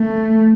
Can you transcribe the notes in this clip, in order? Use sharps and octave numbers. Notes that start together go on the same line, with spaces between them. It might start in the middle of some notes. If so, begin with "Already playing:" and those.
Already playing: A3